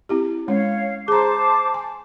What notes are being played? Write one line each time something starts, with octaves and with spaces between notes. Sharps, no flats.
C4 E4 G4
G#3 C#4 C#5 F5
G#4 C5 A5 A#5 D6
G#5